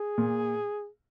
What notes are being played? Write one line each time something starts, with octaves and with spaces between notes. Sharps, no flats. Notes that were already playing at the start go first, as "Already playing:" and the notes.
Already playing: G#4
A#2